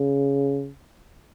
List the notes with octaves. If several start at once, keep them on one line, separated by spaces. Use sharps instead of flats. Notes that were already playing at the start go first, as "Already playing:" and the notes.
Already playing: C#3